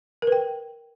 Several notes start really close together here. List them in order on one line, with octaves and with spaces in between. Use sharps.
A#4 B4 G5